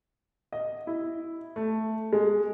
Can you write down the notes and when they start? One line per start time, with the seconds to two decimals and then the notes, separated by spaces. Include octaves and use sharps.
0.53 D#5
0.87 E4
1.56 A3
2.13 G#3